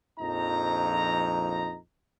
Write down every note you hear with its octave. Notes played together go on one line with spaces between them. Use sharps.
A#1 F2 D#4 A#5